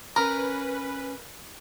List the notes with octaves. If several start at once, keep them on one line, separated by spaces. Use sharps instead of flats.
C#4 A#4 B4 A#5